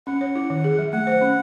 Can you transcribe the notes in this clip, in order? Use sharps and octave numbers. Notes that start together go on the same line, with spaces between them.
C#4 F#5
C#5
E4
D#3
G#4
F#3
A3 F#5
C5
C#4